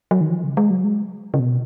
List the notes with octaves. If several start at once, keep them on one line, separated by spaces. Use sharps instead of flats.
F#3
D#3
F3
C#3
G#3
F#3
G#3
C#3
B2